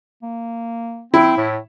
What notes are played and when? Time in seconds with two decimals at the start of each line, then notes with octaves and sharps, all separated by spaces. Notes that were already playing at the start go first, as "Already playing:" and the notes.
0.23 A#3
1.14 C4 E4
1.38 A2